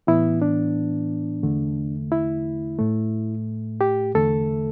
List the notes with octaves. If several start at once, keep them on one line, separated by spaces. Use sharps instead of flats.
A2 E3 B3 E4
D4
E2 D3 A3
E4
A2 A3
G4
E2 D3 A3 A4